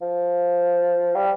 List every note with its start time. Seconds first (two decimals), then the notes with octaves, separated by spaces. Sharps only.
0.02 F3
1.16 G3